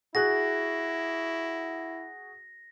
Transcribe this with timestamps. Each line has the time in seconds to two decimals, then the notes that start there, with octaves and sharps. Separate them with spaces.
0.15 E4 F#4 G#4 F#6 A#6